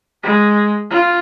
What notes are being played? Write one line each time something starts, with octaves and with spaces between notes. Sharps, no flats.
G#3
F4